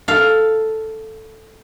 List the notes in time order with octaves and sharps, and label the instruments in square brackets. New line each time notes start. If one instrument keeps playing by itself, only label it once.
[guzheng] A4 F5